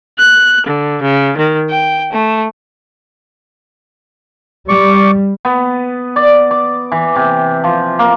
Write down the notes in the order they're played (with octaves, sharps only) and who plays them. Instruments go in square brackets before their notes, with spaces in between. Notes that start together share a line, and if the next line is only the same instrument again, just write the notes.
[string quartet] F#6
D3
C#3
D#3
G5
A3
[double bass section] G3 [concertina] D5 C#6
[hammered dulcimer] B3
D5
D6
E3
C3
F3
A#3